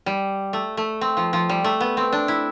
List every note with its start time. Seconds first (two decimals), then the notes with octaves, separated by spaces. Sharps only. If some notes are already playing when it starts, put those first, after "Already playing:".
0.06 G3
0.53 A3
0.77 A3
1.01 C4
1.17 F3
1.33 F3
1.49 G3
1.64 A3
1.81 B3
1.97 C4
2.12 D4
2.28 E4